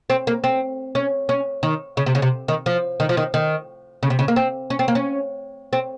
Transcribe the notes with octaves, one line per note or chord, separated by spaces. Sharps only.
C4
A#3
C4
C#4
C#4
D#3
C#3
C3
C#3
C3
D#3
F3
D#3
F3
D#3
D#3
C#3
C3
C#3
A#3
C4
C#4
C4
A#3
C#4
C4